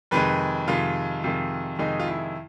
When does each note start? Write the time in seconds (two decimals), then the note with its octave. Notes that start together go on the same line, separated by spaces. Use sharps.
0.11 F2 C3 D#3 G#3 B4
0.67 F2 C3 D#3 G#3 F4
1.24 F2 C3 D#3 G#3
1.79 F2 C3 D#3 G#3 D#4
2.00 F4
2.07 E4